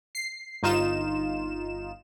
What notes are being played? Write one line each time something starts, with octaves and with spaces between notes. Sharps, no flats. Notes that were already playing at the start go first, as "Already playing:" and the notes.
C7
G1 D#4 F4 E7